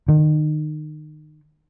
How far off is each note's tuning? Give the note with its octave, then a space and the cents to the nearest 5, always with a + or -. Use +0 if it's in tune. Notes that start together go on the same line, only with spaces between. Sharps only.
D#3 -30